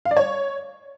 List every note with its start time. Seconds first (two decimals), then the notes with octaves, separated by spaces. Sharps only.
0.05 F5
0.11 D5
0.17 C#5